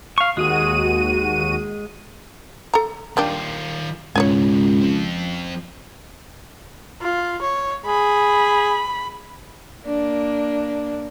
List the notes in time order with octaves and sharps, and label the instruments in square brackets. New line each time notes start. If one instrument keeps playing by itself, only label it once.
[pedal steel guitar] F5 C#6
[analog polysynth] D#2 F#4 D#7 [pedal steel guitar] G#3 G#4
[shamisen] A4 A#5
[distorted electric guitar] D#3 F4 [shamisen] A#3 D4 G4
[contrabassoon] C#2 [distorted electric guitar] G#2 B2 [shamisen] C#5 D5 G#5
[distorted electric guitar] F3 C4
[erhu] F4
C#5
[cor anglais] G#4 [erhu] B5
[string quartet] A#3 D4